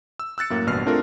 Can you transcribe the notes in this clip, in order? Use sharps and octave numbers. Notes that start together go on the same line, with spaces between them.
E6
E6 F#6 A6 C#7
F#2 A2 A#3
A1 G2 B2 F6 C7
A3 C4 D4 F4 A4 A#4